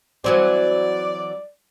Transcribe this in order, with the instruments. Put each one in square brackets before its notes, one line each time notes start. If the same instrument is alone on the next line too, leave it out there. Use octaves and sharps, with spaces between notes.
[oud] E3 F#3 C4 [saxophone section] D5